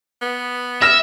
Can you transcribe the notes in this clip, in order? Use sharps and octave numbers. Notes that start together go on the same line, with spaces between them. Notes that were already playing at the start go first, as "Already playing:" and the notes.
B3
E5 E6 F6 A#6 E7